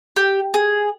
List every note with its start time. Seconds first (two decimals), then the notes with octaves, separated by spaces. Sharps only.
0.16 G4
0.54 G#4